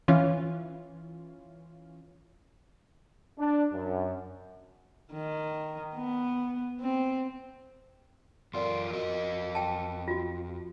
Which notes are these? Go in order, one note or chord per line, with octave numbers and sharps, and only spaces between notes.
E3 C#4 F4
D4
F#2
D#3
B3
C4
F#2 F4 A#4 D5 C6
F2 F#4 A#4 D#5
G5 A5
F4 F#4